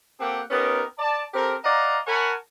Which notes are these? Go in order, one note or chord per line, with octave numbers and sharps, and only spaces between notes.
A#3 C4 G4 A4 F#5 G5
B3 C#4 D#4 G4 A#4
D5 A5
C4 G4 A4 A#4
D5 D#5 F5 F#5 A#5
A#4 C#5 F#5 G#5 A5 B5